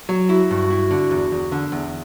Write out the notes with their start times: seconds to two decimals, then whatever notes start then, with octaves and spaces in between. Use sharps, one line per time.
0.09 F#3
0.29 E4 F#4
0.51 G2
0.70 E4
0.91 D3
1.11 E2
1.32 E2
1.52 D3
1.72 E2